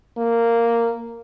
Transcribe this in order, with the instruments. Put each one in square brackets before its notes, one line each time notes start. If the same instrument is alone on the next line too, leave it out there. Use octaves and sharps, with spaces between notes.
[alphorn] A#3